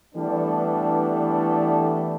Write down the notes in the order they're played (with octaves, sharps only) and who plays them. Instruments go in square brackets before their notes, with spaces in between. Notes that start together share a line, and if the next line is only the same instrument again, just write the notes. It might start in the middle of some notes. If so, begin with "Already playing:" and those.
[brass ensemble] E3 G3 A3 B3 D4